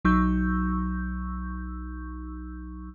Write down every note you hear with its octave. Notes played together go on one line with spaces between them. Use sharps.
B1 F#3 D#4 C#6 E6 G6